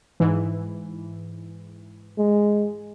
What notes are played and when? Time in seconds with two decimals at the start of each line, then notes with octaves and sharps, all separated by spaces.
0.20 G#2 E3
2.18 G#3